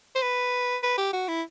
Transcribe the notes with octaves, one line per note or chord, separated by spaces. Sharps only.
C5
B4
B4
G4
F#4
E4